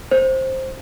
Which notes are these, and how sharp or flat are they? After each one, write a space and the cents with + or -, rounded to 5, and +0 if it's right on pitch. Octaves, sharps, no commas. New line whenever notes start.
C5 +10